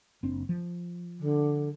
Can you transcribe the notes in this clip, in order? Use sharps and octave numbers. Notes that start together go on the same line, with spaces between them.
F#1 C4 D4
F3
D3